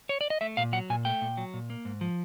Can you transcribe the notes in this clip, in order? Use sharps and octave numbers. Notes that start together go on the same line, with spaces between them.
C#5
D5
D#5
A3 E5
A#2 F5
F#3 F#5
A#2 G#5
A3 G5
A#2
F#3
A#2
A#3
G#2
F3